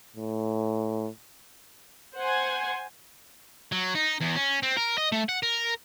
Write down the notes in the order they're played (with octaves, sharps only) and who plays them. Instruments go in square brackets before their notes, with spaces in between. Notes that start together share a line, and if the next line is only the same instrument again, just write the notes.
[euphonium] A2
[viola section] C5 F#5 G#5 C6
[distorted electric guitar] F#3
D#4
E2
C#4
C4
A#4
D#5
A3
F#5
A#4